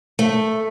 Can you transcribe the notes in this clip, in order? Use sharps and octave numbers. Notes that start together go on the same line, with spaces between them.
A3